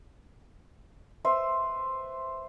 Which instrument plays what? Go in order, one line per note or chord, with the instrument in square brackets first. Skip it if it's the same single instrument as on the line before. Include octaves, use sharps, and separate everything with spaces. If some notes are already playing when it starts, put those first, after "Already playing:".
[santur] B4 C5 E5